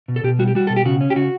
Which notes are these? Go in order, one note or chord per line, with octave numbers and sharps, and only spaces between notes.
B2
A4
B2 G4
G3 F#4
G4
G3 F#4
B2 A4
G4
C#3 F#4
C#4
G4
C#3 F#4